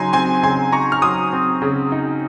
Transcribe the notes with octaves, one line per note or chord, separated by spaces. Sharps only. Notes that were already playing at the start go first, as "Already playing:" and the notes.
Already playing: C#3 F#3 D#4 G#5 A#5 C6
C4 G#5 C6
C#3 G#5 C6
D#4 A#5 C#6
F6
F#3 C6 D#6
C4
C#3
D#4